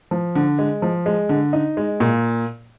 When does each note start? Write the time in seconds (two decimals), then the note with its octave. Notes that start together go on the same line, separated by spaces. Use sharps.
0.11 F3
0.35 D3
0.59 G#3
0.82 F3
1.06 G#3
1.29 D3
1.53 D#4
1.77 G#3
2.00 A#2